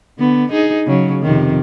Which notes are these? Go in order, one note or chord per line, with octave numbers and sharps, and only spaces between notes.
D3 B3
D#4 G#4
C#3 F#3
F2 C3 D#3